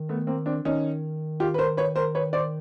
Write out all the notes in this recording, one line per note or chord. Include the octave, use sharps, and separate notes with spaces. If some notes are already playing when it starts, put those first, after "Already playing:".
Already playing: D#3
A3 B3
A#3 C4
C4 D4
D#3 C#4 D#4
F4 G4
B4
A#4 C5
B4 C#5
A#4 C5
B4 C#5
C5 D5